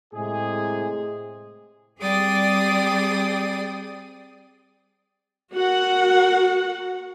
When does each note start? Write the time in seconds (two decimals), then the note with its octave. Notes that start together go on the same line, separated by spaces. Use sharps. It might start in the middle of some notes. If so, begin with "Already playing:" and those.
0.13 A2 C3 G#3 G#4
2.02 G3 C4 G#4 D5 G5 D#6
5.54 F#4 A#4 F#5